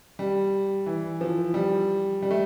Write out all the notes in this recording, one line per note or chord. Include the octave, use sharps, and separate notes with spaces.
G3
E3
F3
G3
G3
A3